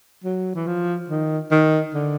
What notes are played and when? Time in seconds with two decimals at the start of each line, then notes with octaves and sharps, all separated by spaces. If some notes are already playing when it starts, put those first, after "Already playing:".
0.24 F#3
0.55 E3
0.67 F3
1.10 D#3
1.51 D#3
1.94 D3